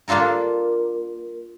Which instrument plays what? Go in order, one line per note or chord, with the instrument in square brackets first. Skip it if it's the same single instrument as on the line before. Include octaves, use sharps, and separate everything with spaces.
[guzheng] A#3 D4 F4 A4 A#4